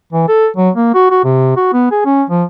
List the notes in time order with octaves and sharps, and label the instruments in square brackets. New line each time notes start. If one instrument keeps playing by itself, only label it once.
[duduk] E3
A4
F#3
A#3
F#4
F#4
C3
F#4
B3
G#4
C#4
F3